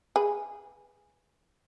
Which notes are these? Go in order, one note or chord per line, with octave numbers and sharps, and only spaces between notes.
G#4 B4